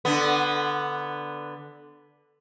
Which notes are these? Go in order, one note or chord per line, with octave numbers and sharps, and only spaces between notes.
D3 B3